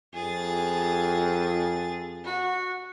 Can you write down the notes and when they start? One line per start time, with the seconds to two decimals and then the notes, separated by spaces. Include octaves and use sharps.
0.14 F2 G#4 A6
2.24 F#4